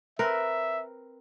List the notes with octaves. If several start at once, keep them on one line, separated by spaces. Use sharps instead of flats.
C4 A#4 B4 E5